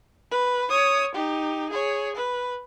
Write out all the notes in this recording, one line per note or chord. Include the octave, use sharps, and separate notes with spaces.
B4
C#5 D#6
D#4 G4
G#4 C#5
B4